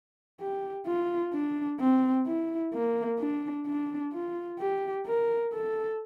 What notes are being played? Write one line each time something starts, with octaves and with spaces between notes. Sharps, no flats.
G4
F4
D4
C4
E4
A#3
D4
D4
F4
G4
A#4
A4